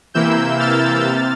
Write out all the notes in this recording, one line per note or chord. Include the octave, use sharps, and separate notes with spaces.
C3 E3 A#3 E4 E6 G6
F6 A6
C3